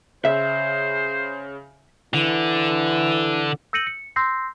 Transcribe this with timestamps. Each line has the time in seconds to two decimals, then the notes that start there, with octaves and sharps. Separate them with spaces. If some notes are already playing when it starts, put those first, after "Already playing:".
0.25 C#3 C5 E5
2.14 D3 E3
3.73 E6 G6 A#6 C#7 D#7 F#7
3.87 C#7
4.16 C6 E6 G6 A#6 C7